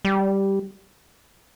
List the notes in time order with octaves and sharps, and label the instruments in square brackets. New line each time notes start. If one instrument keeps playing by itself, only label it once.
[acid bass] G3